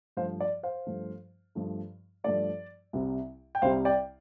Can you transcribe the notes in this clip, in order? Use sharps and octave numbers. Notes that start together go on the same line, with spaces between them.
G2 F3 A3 C5 F5
D5
C5 F5
G2 F3 A3
G2 F3 A3
G2 F3 A3 D5
C2 C3 G3
G5
C2 C3 G3 C5 F5
D5 G5